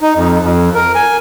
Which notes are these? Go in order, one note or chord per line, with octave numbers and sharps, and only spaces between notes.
D#4
F2
F2
A#4
G#5